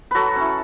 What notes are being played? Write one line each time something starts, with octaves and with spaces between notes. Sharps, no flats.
F#3 F#4 A4 B4
C#4 E4